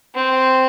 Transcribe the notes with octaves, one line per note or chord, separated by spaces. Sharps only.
C4